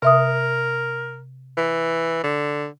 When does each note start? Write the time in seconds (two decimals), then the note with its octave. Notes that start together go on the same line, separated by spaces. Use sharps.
0.02 C3 A#4 E5 D#6
1.57 E3
2.23 D3